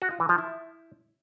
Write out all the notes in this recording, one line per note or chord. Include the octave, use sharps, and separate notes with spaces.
F#4
F4
E3
F3
E4